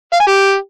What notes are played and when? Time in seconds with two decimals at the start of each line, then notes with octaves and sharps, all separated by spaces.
0.13 F5
0.20 G#5
0.27 G4